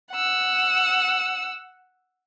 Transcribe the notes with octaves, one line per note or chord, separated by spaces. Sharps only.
F#5 E6